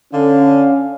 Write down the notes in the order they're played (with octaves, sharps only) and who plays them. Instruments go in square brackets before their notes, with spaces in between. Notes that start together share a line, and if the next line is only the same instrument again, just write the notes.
[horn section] D3 [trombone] C#4 [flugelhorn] F5